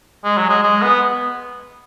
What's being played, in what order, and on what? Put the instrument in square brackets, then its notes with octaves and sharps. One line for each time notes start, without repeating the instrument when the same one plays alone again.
[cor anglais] G#3
F#3
G#3
G#3
B3